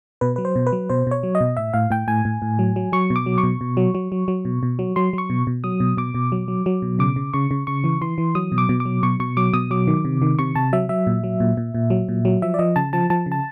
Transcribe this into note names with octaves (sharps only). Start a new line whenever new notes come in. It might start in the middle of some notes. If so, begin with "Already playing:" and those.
B2 B4
F#3 B4
C5
B2
B4
F#3
B2 C5
B2 C#5
F#3
D#5
B2
A2 E5
A2 F5
A2 G5
A2 G#5
A2
A2
F#3
F#3
F#3 C#6
B2
D6
F#3
C#6
B2
B2
F#3
F#3
F#3
F#3
B2
B2
F#3
F#3 C6
F#3 C#6
B2
B2
F#3 D#6
B2
B2 D6
B2
F#3
F#3
F#3
B2
C#3 D6
C#3
C#3 C#6
C#3
C#3 C#6
E3
E3 C6
E3
F#3 D#6
B2
D6
B2
D6
F#3
B2 C#6
B2 C#6
F#3 D6
B2 D#6
F#3 D6
D#3
C3
D#3
C3 C#6
C3 A5
F#3 E5
F#3 E5
A#2
F#3
A#2
A#2
A#2
F#3
A#2
F#3
F3 E5
D5
F3 D#5
C#3 A5
F3 A5
F3 A5
C#3
A5